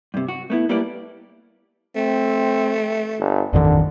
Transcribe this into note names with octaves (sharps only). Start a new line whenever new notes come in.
G2 C3
F#4
A3 B3 E4
G3 A3 A#3 E4 B4 D5
A3 C4
G1
A1 F2 D3 D#3